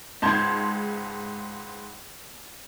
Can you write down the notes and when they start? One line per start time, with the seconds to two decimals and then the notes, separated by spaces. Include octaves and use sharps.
0.22 C#2 G#2 A5 C6 G6 G#6